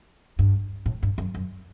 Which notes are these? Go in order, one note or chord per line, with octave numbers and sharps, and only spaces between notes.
G2
A2
G2
F#2
F#2